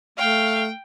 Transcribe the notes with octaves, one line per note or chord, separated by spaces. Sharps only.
A3 F5 G5